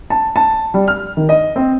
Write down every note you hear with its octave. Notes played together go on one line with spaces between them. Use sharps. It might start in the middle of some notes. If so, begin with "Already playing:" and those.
A5
A5
G3
F6
D#3
D#5
C4